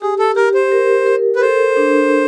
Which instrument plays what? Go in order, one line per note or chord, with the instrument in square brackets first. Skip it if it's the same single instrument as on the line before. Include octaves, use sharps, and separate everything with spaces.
[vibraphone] G4 [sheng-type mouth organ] G#4
[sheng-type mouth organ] A4
[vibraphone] G4 [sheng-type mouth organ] A#4
[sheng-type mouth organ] C5
[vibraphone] A#4
A#4
[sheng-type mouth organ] B4
[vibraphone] A4 [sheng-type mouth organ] C5
[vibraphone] D4